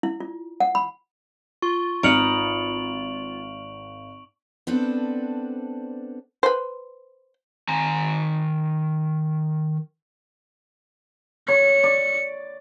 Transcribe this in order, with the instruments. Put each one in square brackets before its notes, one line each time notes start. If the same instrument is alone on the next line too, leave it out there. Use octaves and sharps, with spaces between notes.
[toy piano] E4
F4
F#5
B5
[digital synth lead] F4 [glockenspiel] C#6
[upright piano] G#1 F6 C#7 [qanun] D#4 B4 [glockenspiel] D7 F7 F#7
[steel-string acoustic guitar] B3 C4 D4 A4 B4 C5
[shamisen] B4 C5
[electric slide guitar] D#3 G#5 A#5
[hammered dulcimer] C#5 [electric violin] C#7
[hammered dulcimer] D5